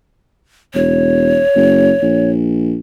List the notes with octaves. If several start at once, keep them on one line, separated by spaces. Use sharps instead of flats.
E1 C#5
F#1
A#1